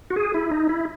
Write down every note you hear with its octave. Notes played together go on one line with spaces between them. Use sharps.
F#4
G#4
E4
D#4
E4